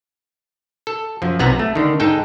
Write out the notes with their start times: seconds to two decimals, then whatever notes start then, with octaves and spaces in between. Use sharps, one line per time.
0.87 A4
1.22 F#2 F3
1.39 B1 C3 B3 F#5 A#5
1.59 A3
1.75 D3 D#3
2.00 G#2 D#4 A4 G5